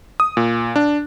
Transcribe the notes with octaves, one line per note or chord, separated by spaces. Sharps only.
D#6
A#2
D4